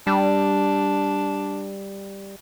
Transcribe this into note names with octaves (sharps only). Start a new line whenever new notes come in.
G3 D4